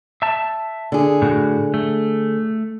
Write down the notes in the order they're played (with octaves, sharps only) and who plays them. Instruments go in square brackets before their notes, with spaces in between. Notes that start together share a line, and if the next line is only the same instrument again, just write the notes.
[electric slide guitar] E5 A5
[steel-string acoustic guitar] D3 G#4
[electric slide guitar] A2 F#4
A3